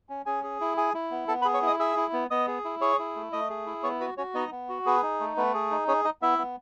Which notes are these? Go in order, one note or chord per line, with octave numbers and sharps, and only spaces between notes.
C#4
C#4 G#4 G#5
G#4
E4
G#4 G#5
E4
B3
B3 A4 A5
B4 B5
G#4
C#5 C#6
E4 D#5 D#6
G#4 E5 E6
E4
B3
B3 D#5 D#6
G#4
E4
G#4 C#5 C#6
E4
A3
A3 D#5 D#6
G#4
E4
B3 C#5 C#6
F#4 B4 B5
C#4 F#4 C#5
B3 D#4 D#5
B3
F#4
B3 G#4 B4
D#4
A3
A3 B3 B4
G#4
D#4
C#4 G#4 C#5
D#4 D#5
B3 E4 E5
B3